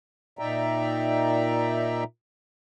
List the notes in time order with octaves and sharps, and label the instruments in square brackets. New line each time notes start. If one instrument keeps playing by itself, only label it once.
[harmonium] A#2 D#4 D5 E5 G5 A#5